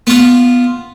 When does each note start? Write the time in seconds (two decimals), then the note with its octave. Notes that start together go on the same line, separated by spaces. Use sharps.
0.07 B3 F4